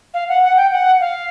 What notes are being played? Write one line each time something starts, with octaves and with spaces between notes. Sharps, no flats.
F5
F#5
F#5
G5
F#5
F5